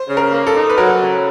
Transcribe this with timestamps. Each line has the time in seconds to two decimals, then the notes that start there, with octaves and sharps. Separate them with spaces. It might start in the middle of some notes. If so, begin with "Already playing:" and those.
Already playing: C5
0.09 C#3
0.17 A#4
0.32 A#3
0.47 A4
0.55 D#4
0.70 B4
0.78 F#3 A#4
1.01 C#3